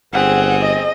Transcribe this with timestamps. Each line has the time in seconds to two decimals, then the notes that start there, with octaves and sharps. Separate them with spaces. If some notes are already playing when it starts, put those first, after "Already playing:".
0.13 G1 C4 G#4 F#5
0.62 D#5